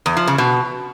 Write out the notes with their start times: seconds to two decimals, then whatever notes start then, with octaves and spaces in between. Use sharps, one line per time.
0.06 E2
0.17 F3
0.27 C#3
0.38 B2